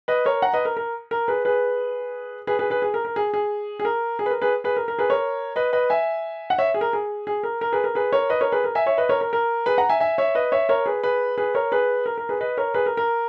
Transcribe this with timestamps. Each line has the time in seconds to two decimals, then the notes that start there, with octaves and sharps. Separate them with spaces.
0.08 B4 D#5
0.25 A#4 C#5
0.42 F#5 A#5
0.54 B4 D#5
0.65 A#4
0.77 A#4
1.11 A#4
1.28 G#4 B4
1.45 G#4 B4
2.47 G#4 B4
2.59 G#4 B4
2.70 G#4 B4
2.82 G#4
2.94 A#4
3.05 A#4
3.16 G#4
3.34 G#4
3.80 G#4
3.85 A#4
4.19 G#4
4.26 B4
4.31 A#4
4.42 G#4 B4
4.64 G#4 B4
4.77 A#4
4.88 A#4
4.99 G#4 B4
5.10 A#4 C#5
5.56 B4 D#5
5.73 B4 D#5
5.90 E5 G#5
6.50 F#5
6.58 C#5 E5
6.74 G#4
6.81 A#4
6.93 G#4
7.27 G#4
7.43 A#4
7.61 A#4
7.73 G#4 B4
7.84 A#4
7.95 G#4 B4
8.13 A#4 C#5
8.30 B4 D#5
8.41 A#4 C#5
8.52 G#4 B4
8.64 A#4
8.75 E5 G#5
8.86 C#5 E5
8.98 B4 D#5
9.09 A#4 C#5
9.21 A#4
9.33 A#4
9.66 G#4 B4
9.78 F#5 A#5
9.90 E5 G#5
10.00 E5 G#5
10.18 C#5 E5
10.35 B4 D#5
10.52 C#5 E5
10.69 A#4 C#5
10.86 G#4 B4
11.03 G#4 B4
11.38 G#4 B4
11.55 A#4 C#5
11.72 G#4 B4
12.06 A#4
12.18 A#4
12.29 G#4 B4
12.41 B4 D#5
12.57 A#4 C#5
12.74 G#4 B4
12.86 A#4
12.97 A#4